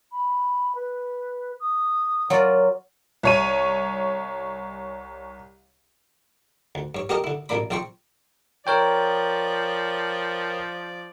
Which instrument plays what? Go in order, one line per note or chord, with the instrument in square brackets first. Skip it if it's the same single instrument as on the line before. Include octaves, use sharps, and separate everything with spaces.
[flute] B5
B4
D#6
[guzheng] F#3 F4 D5 [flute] A#4
[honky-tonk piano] C2 C#5 D#7
[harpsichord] D2
G2 C#5
A#3 F#4 G4 A#4 D#5 A5
D3 E4
A1 A#2 A#3 D4 B5
A#1 F3 C4 G5 C6 C#6
[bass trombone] F3 [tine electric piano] A#4 C#5 G5 [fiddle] D5